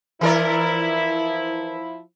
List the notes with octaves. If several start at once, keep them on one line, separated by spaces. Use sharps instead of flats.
E3 F3 E4 A#4 D5